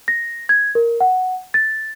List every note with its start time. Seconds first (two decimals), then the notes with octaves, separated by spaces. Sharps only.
0.08 A#6
0.49 G#6
0.75 A#4
1.00 F#5
1.54 A6